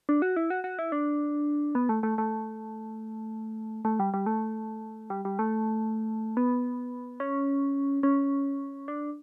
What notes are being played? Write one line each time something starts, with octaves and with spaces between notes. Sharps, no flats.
D4
F#4
E4
F#4
F#4
E4
D4
B3
A3
A3
A3
A3
G3
G3
A3
G3
G3
A3
B3
C#4
C#4
D4